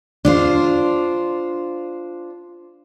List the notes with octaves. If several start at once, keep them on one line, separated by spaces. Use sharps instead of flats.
D4 F4 C5